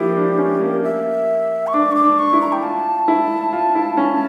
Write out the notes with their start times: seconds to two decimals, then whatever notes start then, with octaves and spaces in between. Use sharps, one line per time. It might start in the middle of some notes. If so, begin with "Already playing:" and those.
Already playing: F3 A#3 E4 G4
0.16 D4
0.39 C#4
0.61 A#3
0.84 E5
1.67 C#6
1.73 D4 D6
1.92 C#6
1.95 D6
2.04 D4
2.19 C#6
2.33 E4
2.41 A#5
2.52 G5
2.63 F4 A5
3.08 E4
3.53 F4
3.75 E4
3.97 C#4